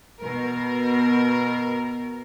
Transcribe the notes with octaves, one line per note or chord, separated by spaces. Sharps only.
B2 A#4